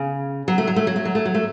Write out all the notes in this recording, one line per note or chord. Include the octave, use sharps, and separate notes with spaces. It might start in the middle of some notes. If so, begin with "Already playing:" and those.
Already playing: C#3
F#3
A3
F#3
A3
F#3
A3
F#3
A3
F#3
A3